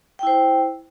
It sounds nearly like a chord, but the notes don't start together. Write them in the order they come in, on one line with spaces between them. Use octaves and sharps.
G5 E4 C5